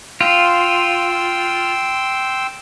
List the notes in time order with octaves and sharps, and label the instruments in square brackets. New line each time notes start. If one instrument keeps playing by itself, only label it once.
[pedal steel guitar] F4 [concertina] G5 C6 E6